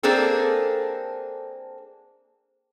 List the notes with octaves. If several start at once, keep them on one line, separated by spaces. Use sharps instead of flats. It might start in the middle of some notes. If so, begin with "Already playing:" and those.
A#3 C4 D4 G#4 A4